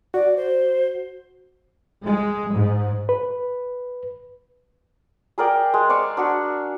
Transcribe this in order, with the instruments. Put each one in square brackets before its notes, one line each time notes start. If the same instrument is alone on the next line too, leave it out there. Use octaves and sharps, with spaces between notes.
[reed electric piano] F#4 [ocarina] D5
[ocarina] C5
[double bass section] G#3
G#2
[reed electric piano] B4
[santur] G#4 A#4 D5 G5
G#3
D5 F5 C#6 E6
D4 F#4 C#6